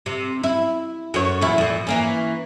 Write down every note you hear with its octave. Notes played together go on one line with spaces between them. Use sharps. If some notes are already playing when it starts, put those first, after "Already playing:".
C3
E4
F#2 C#5
E2 A#2 E4
F2 A#2
E3 A#3 C#4